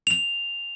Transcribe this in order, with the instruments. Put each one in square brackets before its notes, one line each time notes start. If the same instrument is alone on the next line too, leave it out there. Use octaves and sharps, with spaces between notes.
[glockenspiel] F7